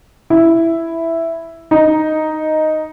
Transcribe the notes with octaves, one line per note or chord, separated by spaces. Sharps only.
E4
D#4